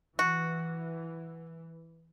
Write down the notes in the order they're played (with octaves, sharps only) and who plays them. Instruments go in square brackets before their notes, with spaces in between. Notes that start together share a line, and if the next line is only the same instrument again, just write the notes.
[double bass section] E3 [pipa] F#4